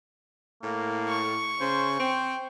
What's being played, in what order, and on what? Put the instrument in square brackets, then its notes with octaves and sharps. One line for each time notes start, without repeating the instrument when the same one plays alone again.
[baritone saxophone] A2 [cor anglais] A#3
[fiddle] C#6
[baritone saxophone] C#3 [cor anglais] C5
[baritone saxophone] C4 [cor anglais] G5